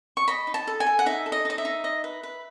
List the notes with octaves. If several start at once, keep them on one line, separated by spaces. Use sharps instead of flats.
C#6
D#5 B5
D#4
A5
A4
G#5
A4
F#5
D#4 E5
A4
D#5
D#4 D#5
E5
D#4
D#5
B4
B4